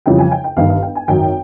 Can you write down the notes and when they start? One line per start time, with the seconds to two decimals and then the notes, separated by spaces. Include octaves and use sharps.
0.06 F2 C#3 E3 G3 G5
0.19 G#5
0.31 G5
0.44 G5
0.57 G1 G2 D#3 F5
0.70 F5
0.82 G5
0.95 G#5
1.08 G#1 F#2 D#3 F#3 G5